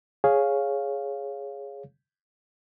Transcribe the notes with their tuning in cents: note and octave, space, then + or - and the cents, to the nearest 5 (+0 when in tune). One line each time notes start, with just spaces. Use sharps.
G#4 +0 C#5 +0 F5 +0